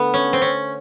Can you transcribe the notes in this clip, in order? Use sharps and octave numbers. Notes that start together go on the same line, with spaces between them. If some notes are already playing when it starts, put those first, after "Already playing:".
Already playing: D3 A3 B3
C#4
C4
C#4